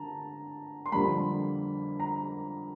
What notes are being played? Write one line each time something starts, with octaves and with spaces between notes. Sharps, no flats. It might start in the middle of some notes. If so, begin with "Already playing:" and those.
Already playing: D3 A5 A#5
C6
F2 D3 G3 A#3 B5
A#5